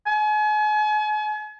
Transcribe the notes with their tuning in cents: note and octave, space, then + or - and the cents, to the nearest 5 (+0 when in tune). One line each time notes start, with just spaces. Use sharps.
G#5 +40